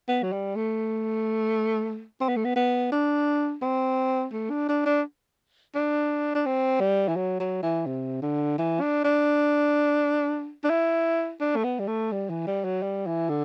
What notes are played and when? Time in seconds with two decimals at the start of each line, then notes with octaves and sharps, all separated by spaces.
0.08 B3
0.23 F#3
0.32 G3
0.56 A3
2.21 C4
2.28 B3
2.36 A3
2.44 B3
2.56 B3
2.92 D4
3.62 C4
4.33 A3
4.50 D4
4.69 D4
4.86 D4
5.75 D4
6.35 D4
6.46 C4
6.80 G3
7.08 E3
7.16 F#3
7.40 F#3
7.63 E3
7.86 C3
8.22 D3
8.58 E3
8.81 D4
9.04 D4
10.64 D4
10.70 E4
11.41 D4
11.56 A3
11.64 B3
11.79 G3
11.88 A3
12.12 G3
12.30 E3
12.47 G3
12.64 F#3
12.82 G3
13.06 E3
13.29 D3